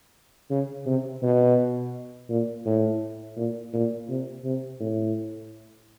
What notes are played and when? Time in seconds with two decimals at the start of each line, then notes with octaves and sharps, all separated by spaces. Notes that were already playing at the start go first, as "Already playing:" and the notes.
0.50 C#3
0.86 C3
1.22 B2
2.29 A#2
2.66 A2
3.36 A#2
3.73 A#2
4.09 C3
4.44 C3
4.80 A2